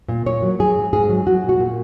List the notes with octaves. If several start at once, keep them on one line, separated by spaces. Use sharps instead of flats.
A#2
A#2 C#5
F#3
F#3 G#4
G#2
G#2 G#4
F#3
F#3 F#4
A#2
F#4
A#2